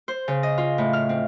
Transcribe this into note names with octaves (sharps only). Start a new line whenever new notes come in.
C5
C#3
D#5
F4
A2
F6
C4